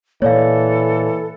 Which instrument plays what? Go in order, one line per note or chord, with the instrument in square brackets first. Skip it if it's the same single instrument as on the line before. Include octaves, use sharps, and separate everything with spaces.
[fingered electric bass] A#2 A#3 [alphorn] E3 [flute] A4 [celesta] C#5 D5 F5